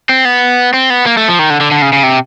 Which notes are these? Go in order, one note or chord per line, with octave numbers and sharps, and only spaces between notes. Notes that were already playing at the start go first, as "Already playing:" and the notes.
C4
B3
C4
B3
A#3
A3
F3
D#3
D3
D3
D3
C#3
C#3
C3